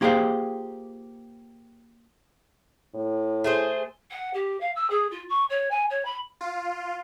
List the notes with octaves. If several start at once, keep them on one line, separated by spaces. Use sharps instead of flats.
A#3 F4 G4 G#4 C5 F5
A2
A3 G#4 C5
F#5
G4
F5
E6
G#4
F4
C#6
C#5
G#5
C#5
B5
F4